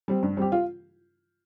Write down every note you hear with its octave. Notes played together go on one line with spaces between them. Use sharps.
G3 C4
G2
G3 C4 G4
F4